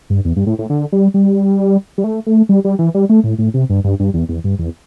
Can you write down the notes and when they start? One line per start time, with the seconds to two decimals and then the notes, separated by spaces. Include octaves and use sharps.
0.10 G2
0.25 E2
0.36 G2
0.47 A2
0.59 A2
0.70 D3
0.92 G3
1.14 G3
1.98 G3
2.04 A3
2.27 A3
2.49 G3
2.65 G3
2.79 E3
2.94 G3
3.09 A3
3.24 A2
3.39 A2
3.54 C3
3.70 G2
3.84 G2
4.00 G2
4.14 E2
4.29 E2
4.44 G2
4.59 E2